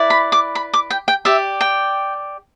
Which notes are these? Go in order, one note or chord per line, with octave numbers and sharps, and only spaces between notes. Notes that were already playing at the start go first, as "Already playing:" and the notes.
Already playing: E4 B4 D5
B5
D6
B5
D6
G5
G5
G4 D5 E5
G5